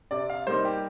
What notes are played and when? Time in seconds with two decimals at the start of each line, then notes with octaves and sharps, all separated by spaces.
0.11 C3 D5
0.30 F5
0.47 G3 A#3 D#4 C5
0.65 G4